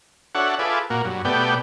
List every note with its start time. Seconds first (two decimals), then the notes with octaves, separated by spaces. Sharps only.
0.35 D4 F#4 A4 C#5 E5 F#5
0.59 F4 G#4 A4 B4 E5 D6
0.90 A#2 A#3 F#4
1.05 G2 F#3
1.25 B2 A3 B3 G4 D5 G5